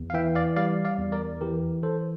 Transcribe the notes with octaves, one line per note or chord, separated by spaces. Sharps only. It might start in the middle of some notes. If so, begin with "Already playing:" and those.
Already playing: E2
F5
E3 E5 G5
D5 F5
G3 D5 F5
D5 F5
E2
A#4 D5
E3 G4 A#4
E3 A4 C5